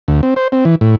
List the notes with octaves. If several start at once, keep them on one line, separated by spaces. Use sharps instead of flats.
D2
C4
C5
C4
E3
A2